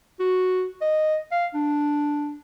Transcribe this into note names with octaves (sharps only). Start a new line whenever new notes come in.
F#4
D#5
F5
D4